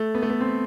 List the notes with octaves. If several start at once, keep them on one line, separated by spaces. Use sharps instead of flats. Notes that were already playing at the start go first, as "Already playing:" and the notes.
Already playing: A3
B3
A3
B3
C4